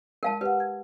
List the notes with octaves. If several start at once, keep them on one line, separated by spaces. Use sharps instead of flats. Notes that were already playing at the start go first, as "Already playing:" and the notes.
G#3 A#4 F5 A5
G4 B4 F#5
G#6